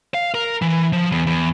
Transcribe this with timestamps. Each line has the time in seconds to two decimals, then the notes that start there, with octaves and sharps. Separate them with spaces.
0.14 F5
0.34 A#4
0.62 E3
0.93 F3
1.12 E2
1.26 E2